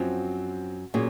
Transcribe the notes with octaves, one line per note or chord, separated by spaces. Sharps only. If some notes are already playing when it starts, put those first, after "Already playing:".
Already playing: F#2 F3 C4 F#4
A#2 F#3 C#4 G#4